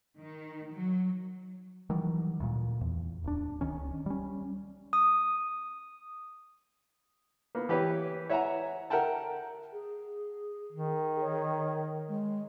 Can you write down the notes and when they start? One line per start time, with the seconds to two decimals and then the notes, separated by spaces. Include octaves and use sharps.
0.19 D#3
0.72 F#3
1.90 D#3 E3 F#3 G3
2.40 D2 A#2
2.81 E2
3.24 D1 D4
3.61 C#2 D#3 C#4
4.06 G3 C#4
4.93 D#6
7.55 A#3 B3
7.69 E3 G4 B4 C#5
8.29 C#5 E5 F#5 G#5 A#5
8.90 A#4 E5 F#5 G5 A5
9.73 G#4
10.72 D#3
11.21 C#5
12.08 G#3